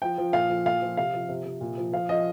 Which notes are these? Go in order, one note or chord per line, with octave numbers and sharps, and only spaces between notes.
F3 G5
F3
A#2 F5
F3
A#2 F5
F3
C3 F5
F3
C3
C3
A#2
F3
F3 F5
F3 D#5